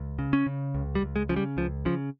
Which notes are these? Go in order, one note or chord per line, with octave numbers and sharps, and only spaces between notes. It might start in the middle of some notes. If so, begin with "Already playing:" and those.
Already playing: C#2
C#3
C#4
C#3
C#2
G3
C#2
G#3
C#3 F3
G3
C#2 F3
C#3 F3